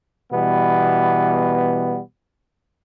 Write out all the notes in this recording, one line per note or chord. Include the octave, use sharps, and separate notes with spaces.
B2 E3 G3 B3